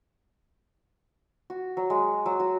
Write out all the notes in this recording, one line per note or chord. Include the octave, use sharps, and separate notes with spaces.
F#4
F#3
G#3
F#3
F#4